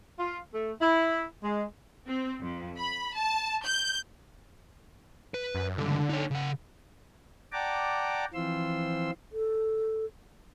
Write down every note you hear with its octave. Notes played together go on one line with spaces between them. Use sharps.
F4
A3
E4
G#3
C4
F2
B5
A5
G6
B4
F#2
C#2 G2 D3
D#4 C#5
C#3 F#5
D5 F#5 G5 A5 A#5 D6
E3 F3 C4 F4 C6 E6
A4